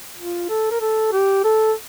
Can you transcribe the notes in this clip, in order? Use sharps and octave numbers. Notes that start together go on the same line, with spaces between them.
F4
A4
A#4
A4
G4
A4